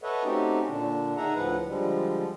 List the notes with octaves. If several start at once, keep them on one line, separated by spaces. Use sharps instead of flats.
A4 B4 C#5 D#5 E5 F#5
A3 C4 C#4 D#4 F#4 G4
A#2 D3 D4
D#4 G#4 E5 F#5 A#5
D2 A2 F3 B4 F#5
D3 F3 G3 G#3